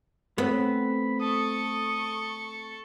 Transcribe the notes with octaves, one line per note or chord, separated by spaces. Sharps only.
A3 B3 C4 B5
A4 C#6 D#6